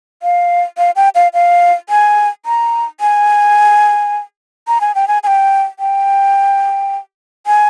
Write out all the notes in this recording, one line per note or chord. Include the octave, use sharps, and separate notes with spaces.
F5
F5
G5
F5
F5
G#5
A#5
G#5
A#5
G#5
G5
G#5
G#5
G5
G5
G#5